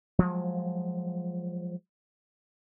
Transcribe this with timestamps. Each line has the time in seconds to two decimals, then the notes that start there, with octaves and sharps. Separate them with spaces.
0.19 F3 F#3 G#3